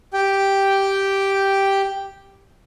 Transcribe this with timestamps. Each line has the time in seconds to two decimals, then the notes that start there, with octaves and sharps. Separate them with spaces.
0.13 G4 G5